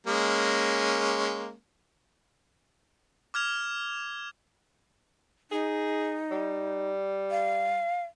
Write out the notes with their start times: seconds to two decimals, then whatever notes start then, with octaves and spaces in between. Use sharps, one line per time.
0.07 G#3 A#3 C#4
3.34 D6 F6 G#6 F7
5.51 D#4 G#4
6.31 G3
7.31 F5